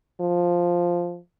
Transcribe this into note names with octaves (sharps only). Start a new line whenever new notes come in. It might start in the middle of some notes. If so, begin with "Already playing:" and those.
F3